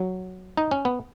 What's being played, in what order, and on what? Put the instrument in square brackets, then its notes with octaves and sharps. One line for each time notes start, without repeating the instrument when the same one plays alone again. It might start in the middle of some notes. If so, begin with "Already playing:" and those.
Already playing: [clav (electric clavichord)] F#3
D#4
C#4
B3